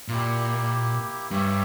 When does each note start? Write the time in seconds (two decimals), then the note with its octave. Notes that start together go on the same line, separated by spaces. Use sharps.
0.08 A#2 A#3 E4 G4
1.31 G2 C#4 G4 C#5 E5